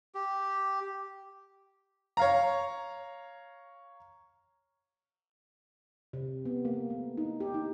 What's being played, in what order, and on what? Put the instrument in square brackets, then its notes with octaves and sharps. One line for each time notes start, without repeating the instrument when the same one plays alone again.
[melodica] G4
[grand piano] C#5 F5 A#5
[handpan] C3
B3
A#3
A3
D#4
G4
D#4